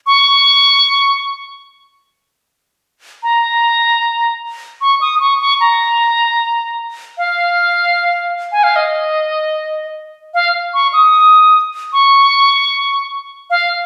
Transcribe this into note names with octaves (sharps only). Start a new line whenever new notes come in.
C#6
A#5
C#6
D#6
C#6
C#6
A#5
F5
G#5
F5
D#5
F5
C#6
D#6
C#6
F5